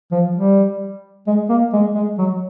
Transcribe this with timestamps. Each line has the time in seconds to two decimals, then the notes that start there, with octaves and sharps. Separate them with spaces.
0.11 F3
0.35 G3
1.27 G#3
1.49 A#3
1.73 G#3
1.95 G#3
2.18 F#3